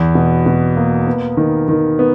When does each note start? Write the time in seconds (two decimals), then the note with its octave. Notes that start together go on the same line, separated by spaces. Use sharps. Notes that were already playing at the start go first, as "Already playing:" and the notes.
Already playing: E2
0.15 B2
0.46 B2
0.76 A#3
1.07 B3
1.37 D#3
1.68 D#3
1.99 B3